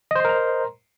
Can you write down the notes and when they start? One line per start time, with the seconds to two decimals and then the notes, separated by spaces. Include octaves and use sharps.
0.11 D#5
0.15 C5
0.20 C6
0.25 A#4
0.29 A#5